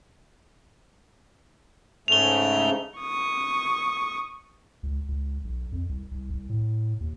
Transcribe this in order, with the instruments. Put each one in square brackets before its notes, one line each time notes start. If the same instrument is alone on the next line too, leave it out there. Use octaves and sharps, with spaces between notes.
[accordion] G#2 C#3 A3 [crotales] F7 G7
[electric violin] C#6 D#6
[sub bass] C#2
C#2
B1
F2
C2
C2
C2
A2
D#2